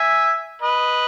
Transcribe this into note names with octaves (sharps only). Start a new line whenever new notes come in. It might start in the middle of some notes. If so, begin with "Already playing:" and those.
Already playing: E5 G#5
B4 D#5